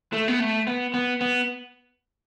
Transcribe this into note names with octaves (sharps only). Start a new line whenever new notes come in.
A3
B3
A3
B3
B3
B3